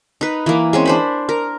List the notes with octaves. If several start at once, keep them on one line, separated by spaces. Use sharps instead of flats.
D#4 B4
E3 A#3
G#3 C4 C#4
D4 C5 B5
A#4